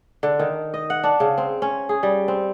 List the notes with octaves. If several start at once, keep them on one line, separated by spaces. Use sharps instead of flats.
D3
D#3
D#5
F#5
D4
C#3
C4
C#4
G#4
G3
C4